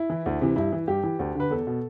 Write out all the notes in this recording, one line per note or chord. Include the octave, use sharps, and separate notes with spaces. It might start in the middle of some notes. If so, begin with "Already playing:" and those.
Already playing: E4
E3
D2
C3 E3
G2 E4
E3
G2 G4
E3
D2
D3 B4
E2 A4
B2